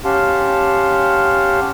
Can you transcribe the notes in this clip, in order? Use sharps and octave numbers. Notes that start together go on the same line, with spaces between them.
C#4 G4 F5 F#5 A5 C6